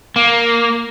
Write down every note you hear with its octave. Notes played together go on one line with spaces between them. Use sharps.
A#3